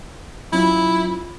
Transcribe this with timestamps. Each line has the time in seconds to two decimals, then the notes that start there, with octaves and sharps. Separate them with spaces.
0.53 F#3 C#4 E4 F4